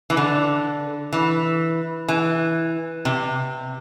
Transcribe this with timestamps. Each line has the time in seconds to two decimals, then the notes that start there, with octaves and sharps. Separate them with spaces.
0.10 E3
0.17 D3
1.13 E3
2.08 E3
3.05 C3